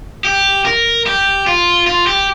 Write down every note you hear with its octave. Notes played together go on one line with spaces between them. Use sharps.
G4
A#4
G4
F4
F4
G4